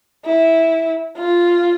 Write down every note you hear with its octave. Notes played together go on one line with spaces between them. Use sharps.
E4
F4